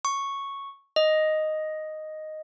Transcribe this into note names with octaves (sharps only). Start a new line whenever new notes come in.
C#6
D#5